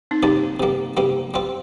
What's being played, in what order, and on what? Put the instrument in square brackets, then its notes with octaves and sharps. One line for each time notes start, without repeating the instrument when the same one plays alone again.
[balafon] C4 D#4
[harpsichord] C3 G3 A#3 [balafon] C4 D#4
[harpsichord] C3 G3 A#3
C3 G3 A#3
G3 C4 F4